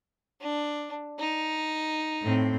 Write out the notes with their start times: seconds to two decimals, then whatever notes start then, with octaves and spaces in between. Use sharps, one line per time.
0.41 D4
1.19 D#4
2.23 A2 C4